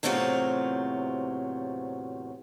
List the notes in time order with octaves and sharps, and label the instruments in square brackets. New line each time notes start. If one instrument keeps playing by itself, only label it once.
[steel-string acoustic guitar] E2 A2 C3 F#3 C4 F4